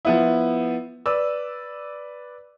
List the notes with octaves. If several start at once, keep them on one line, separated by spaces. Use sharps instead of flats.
F3 B3 E4
B4 D5 E6